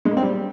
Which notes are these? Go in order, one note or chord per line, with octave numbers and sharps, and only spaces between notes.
G#3
A#3
C4
G3